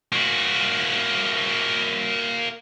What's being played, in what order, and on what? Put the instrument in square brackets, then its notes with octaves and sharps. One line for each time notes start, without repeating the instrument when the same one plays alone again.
[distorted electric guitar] A#3 F#4